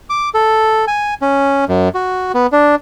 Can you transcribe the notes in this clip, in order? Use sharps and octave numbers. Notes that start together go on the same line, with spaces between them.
D6
A4
G#5
C#4
F#2
F#4
B3
D4